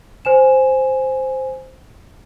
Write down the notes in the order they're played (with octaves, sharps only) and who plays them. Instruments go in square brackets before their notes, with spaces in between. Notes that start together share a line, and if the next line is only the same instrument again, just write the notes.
[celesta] C5 G#5 E7